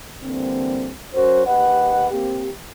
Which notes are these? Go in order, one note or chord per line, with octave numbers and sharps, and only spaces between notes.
D3 E3 G3 A#3 C4
F#3 C#4 F#4 A#4 C5
D#2 G4 B4 D#5 F#5
A#3 C4 G4